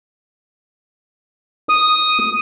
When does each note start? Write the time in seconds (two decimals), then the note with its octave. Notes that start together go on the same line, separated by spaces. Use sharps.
1.69 D#6